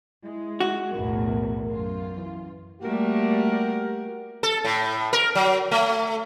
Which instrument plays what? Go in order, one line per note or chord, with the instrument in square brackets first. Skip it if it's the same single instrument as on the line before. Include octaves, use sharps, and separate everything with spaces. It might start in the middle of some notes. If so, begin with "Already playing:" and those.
[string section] G#3 [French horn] E4
[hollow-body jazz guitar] F#4
[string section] B1 E2 A2 [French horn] A#4
[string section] F#2 F4
[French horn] E3
[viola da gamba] G3 A3 A#3 [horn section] F#4 G4 A#4
[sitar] A4
A2
A#4
F#3
A3